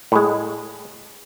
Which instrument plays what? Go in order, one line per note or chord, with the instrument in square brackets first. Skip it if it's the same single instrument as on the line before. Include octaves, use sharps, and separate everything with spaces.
[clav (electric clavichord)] A2 G#3